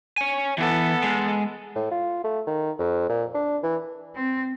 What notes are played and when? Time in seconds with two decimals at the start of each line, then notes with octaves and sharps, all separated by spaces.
0.18 C#5 G#5
0.58 E3 B3 A4
1.03 G#3
1.76 A2
1.92 F4
2.24 A3
2.47 D#3
2.79 F2
3.10 A#2
3.35 D4
3.63 E3
4.15 C4